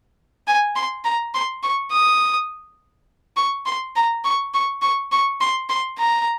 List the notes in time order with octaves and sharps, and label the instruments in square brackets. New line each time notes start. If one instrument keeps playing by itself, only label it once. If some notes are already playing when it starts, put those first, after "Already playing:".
[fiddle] G#5
C6
A#5
C6
C#6
D#6
C#6
C6
A#5
C#6
C#6
C#6
C#6
C6
C6
A#5